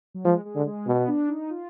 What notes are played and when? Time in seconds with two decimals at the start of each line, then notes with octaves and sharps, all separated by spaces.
0.14 F#3
0.25 F3 G#3
0.45 G#3
0.55 D3
0.66 G#3
0.87 B2 B3
1.08 D4
1.28 D#4
1.50 F4